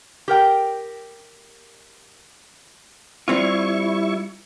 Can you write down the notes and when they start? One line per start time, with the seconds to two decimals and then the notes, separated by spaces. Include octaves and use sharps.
0.28 G4 A#4 G5
3.28 G3 C4 E4 F4 C#6